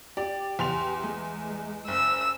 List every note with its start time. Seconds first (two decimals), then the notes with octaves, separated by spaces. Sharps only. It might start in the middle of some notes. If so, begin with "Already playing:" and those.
0.17 G4 D5
0.59 E2 C6 F7
1.04 G#3
1.88 F#1 E6